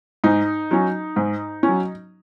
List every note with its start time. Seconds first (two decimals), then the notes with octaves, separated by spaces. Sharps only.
0.24 G#2 D#4
0.71 F#3 C#4
1.16 G#2
1.63 C#4
1.68 F#3